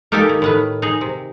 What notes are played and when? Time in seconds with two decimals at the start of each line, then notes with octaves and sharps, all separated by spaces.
0.12 A#3 D#4 G4 A4 E5 G#5
0.29 D#3
0.42 A2 D#3 B4
0.82 D#4 G#4
1.01 C3